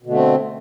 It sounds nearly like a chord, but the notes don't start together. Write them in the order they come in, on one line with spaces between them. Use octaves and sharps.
B2 D3 A3 C4